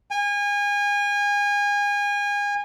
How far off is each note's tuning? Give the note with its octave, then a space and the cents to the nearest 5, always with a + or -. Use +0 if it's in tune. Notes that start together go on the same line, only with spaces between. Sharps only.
G#5 -30